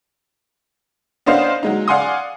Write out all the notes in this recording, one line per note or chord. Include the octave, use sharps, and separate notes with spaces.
B3 C#4 D4 C5 D#5 F5
F#3 G#3 D#4
D5 F5 F#5 G#5 C6 D#6